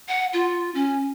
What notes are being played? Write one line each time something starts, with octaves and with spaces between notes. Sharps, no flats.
F#5
F4
C#4